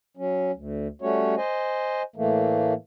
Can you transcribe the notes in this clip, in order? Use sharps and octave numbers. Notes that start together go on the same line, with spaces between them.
F#3 C#4
D2
G3 A3 C#4 F#4 C#5
C5 D#5 G#5
A2 E3 A3 A#3